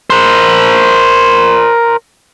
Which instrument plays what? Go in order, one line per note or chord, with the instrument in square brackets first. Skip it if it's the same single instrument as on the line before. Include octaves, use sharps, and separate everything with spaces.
[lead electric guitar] A#4 C5